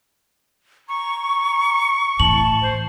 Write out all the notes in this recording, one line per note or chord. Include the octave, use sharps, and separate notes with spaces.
A#5 C#6
A2 E3 A5 F#7
C5